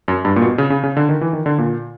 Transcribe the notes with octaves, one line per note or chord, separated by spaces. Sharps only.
F#2
G2
A#2
B2
C#3
C#3
C#3
D3
D#3
E3
D#3
D3
A#2